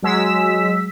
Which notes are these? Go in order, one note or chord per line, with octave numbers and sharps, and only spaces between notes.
F#3 G#3 E6 B6